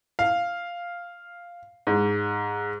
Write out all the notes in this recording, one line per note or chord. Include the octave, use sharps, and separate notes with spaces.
F5
G#2